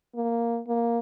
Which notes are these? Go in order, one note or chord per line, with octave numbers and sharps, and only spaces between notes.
A#3
A#3